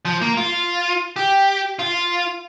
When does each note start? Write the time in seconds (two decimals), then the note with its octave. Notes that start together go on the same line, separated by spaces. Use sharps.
0.05 F3
0.21 A#3
0.37 F4
1.16 G4
1.79 F4